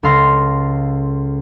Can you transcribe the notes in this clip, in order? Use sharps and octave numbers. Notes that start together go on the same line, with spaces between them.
C#2 A4 F5 C6 A#6